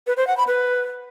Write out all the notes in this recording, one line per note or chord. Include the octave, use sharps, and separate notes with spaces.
B4
C5
F#5
B5
B4